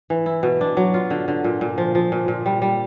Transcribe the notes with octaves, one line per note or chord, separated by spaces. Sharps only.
E3
E4
B2
D4
F#3
F4
D3
D3
A#2
A#2
F3
F3
A#2
A#2
G3
G3